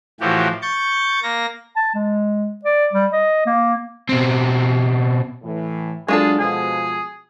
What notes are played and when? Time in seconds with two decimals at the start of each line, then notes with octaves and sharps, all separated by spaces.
0.21 A2 E3 F3 F#4 G4
0.62 C#6 G6 A6
1.23 A#3 A#6
1.76 A5
1.95 G#3
2.65 D5
2.93 G3
3.12 D#5
3.46 A#3
4.09 B2 C4
5.43 A2 E3
6.08 F#3 G#3 D4 F4 G#4 A4
6.39 B2 F3 G#4